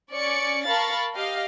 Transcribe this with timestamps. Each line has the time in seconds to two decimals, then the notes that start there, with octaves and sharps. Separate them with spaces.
0.12 C#4 D5 C#6 C#7
0.67 A#4 F5 A5 B5 C#6 A6
1.14 G4 D#5 F5